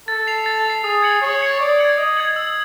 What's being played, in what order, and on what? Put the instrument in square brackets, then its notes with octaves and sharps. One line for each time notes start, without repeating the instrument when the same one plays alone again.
[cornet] A4 [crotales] A6
[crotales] C7 F7
A6
C7 F7
[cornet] G#4 [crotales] D#6
[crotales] G#6 C#7 F#7
[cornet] C#5 [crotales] D#6
[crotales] G#6 C#7 F#7
[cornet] D5 [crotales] D#6
[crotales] G#6 C#7 F#7
[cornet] D#5 [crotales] D#6
[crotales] G#6 C#7 F#7
E6